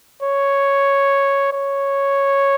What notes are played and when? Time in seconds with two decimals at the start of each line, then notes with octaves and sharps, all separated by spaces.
0.22 C#5
1.52 C#5